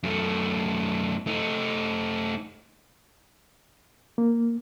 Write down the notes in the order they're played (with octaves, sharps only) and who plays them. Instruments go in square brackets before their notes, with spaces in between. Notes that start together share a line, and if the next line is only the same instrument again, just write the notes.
[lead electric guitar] F#2 A3
A3 D#4
[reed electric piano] A#3